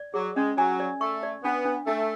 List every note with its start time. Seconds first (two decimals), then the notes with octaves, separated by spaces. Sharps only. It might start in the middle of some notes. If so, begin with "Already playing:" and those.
Already playing: D5
0.14 F#3 G#4
0.36 G#3 C#4
0.57 F#3 G#5
0.80 D5
1.01 A3 C#6
1.23 D5
1.44 B3 D4
1.65 D4
1.87 A3 D4